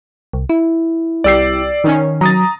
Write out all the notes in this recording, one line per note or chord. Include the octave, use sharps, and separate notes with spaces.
C2
E4
C2 G4 D5 E6 C7
D#3 C#4
F#3 A#5 D#6 A6